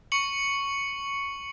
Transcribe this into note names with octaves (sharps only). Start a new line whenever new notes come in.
C#6 C#7 F#7